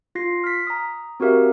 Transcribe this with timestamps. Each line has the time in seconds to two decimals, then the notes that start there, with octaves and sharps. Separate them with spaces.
0.15 F4 A#6 C7
0.44 F6 B6
0.67 A#5 D#6
1.20 C4 F#4 G4 A#4 E5 F5